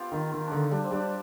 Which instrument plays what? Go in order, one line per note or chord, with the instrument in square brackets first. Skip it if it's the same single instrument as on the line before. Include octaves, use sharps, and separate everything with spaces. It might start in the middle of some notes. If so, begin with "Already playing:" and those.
Already playing: [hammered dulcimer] B3 C4 F4 G4
[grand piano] D#3
D#3
[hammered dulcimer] D4
[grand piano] D3 [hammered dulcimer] D#4
[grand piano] G3 [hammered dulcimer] D4
[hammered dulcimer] C4
[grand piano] G3 [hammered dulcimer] D4